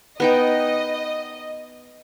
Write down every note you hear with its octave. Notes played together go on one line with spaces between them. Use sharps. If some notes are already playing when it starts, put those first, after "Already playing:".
B3 D#4 D#5 G5